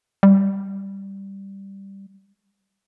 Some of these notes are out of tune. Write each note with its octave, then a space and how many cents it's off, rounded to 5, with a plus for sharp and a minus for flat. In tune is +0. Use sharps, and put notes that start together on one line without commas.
G3 +0